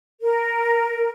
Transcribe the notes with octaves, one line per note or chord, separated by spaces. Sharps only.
A#4